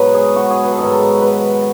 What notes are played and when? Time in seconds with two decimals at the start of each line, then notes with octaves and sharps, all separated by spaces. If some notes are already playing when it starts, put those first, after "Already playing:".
Already playing: G#2 B2 F#3 B4 C#5 D#5
0.14 G#4
0.36 F#4
0.50 G#4
0.64 B4
0.71 A4
0.79 G#2 D#3 F#3 G#4
0.86 A4
1.22 B4